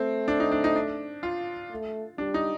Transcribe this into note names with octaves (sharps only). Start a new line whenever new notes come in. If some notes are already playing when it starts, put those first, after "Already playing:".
Already playing: A3 C4
D4
D#4
D4
D#4
D4
F4
A3
G3 D4
D#4